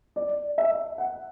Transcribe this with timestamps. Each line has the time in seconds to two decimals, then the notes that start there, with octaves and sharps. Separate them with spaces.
0.16 D5
0.58 E5
0.98 F#5